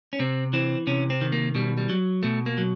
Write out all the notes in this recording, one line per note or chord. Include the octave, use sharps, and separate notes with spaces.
C#4
C3 C4
E3 C4
C3 C#4
C4
D#3
A#3
B2 G3
G3
F#3
B2 A3
A#3
F#3